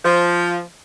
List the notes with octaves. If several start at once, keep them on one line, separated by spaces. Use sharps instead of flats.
F3